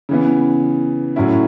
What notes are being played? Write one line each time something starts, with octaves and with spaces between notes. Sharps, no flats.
C#3 E3 B3
A2 F#3 C#4 E4